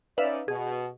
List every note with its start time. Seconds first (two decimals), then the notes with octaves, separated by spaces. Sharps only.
0.18 C#4 D#4 B4 D5 E5 F5
0.48 B2 G#4